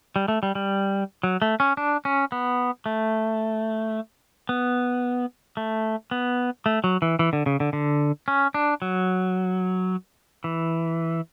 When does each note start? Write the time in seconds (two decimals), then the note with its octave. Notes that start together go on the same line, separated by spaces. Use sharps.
0.16 G3
0.28 A3
0.43 G3
0.55 G3
1.23 F#3
1.42 A3
1.60 C#4
1.77 D4
2.05 C#4
2.32 B3
2.86 A3
4.49 B3
5.57 A3
6.11 B3
6.66 A3
6.84 F#3
7.02 E3
7.19 E3
7.33 D3
7.46 C#3
7.60 D3
7.73 D3
8.28 C#4
8.54 D4
8.82 F#3
10.44 E3